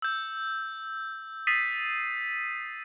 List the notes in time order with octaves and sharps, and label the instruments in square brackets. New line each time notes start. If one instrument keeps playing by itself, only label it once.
[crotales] E6 G6
D#6 E6 A6 B6 C7 D#7